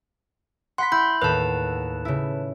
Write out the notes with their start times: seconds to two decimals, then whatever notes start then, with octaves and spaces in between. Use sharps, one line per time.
0.78 F#5 B5 C6 B6
0.92 E4 B5 G6
1.22 D#2 A2 B4 A5
2.05 C#3 E4